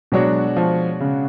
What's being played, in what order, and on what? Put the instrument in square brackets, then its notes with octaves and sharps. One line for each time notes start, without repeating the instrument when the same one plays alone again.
[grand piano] B2 G#3 D4 F#4 C#5 [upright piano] F#3
[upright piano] F3
C#3